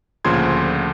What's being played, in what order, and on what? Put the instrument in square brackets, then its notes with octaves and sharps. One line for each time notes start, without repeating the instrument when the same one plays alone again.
[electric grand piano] D2 A#2 C#3 F3 C6 G#6